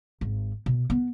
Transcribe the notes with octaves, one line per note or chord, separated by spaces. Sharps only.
G#1
B2
B3